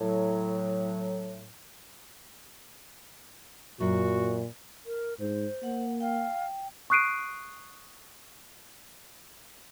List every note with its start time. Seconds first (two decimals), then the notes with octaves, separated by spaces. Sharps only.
0.01 A2 F#3
3.80 F#2 A#2 F#4
4.86 A#4
5.20 G#2 C5
5.63 A#3 F#5
6.00 F5 G5
6.90 C#6 D#6 F#6 C7 D7 D#7